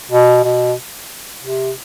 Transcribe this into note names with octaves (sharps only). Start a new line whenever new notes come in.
B2
B2
C3